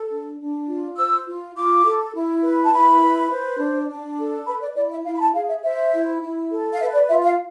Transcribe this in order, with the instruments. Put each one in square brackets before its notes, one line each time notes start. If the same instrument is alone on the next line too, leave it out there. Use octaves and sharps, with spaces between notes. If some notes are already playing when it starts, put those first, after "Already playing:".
Already playing: [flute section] A4
D4
D4
F4
C5 E6
F4
F4 D6
A4
E4
B4
A5
E4 B5
B4
C5
D4
D4
A4
B4 B5
D5
E4 D5
E5
E4 F5
B5
A5
G#4 F5
E5
C5 E5
E4
E4
A4
F5
B4 E5
D5
F4 E5
F5